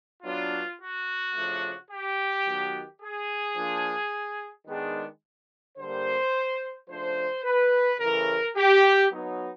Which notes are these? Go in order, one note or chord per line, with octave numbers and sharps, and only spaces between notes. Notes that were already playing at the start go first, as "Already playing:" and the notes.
F#3 B3 D4 F4
F#4
C#3 F3 A3 D4
G4
D#3 F#3 B3
G#4
F3 A#3 D4
D#3 G#3 B3 D4
D3 G3 A#3 C5
C#3 F3 A3 D4 C5
B4
C#3 E3 A3 A#4
G4
F#3 B3 D#4